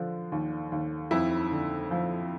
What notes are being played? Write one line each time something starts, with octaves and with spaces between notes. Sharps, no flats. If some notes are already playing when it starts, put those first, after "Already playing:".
Already playing: D3 F3
D#2
D#2
F2 E4
D3
F3